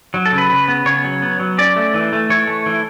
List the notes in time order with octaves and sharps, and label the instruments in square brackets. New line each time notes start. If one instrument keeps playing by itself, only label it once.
[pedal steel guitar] F#3
A4
C#3
B4
C#3
B3
C#3 C#5
F#3
B3
F#3
C#4 D5
A3
E3
A3
E3 C#5
A3
E3